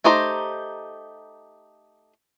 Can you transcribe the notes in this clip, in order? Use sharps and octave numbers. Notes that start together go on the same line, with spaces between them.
A3 D#4 G4 C5 A#5